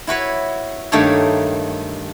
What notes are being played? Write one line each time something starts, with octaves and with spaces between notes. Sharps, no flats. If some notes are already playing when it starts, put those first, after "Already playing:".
E4 F#4 B4 C#5
G2 D#3 A3 A#3 A4 C#5